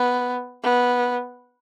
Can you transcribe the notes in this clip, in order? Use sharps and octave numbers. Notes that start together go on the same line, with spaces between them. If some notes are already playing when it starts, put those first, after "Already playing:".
Already playing: B3
B3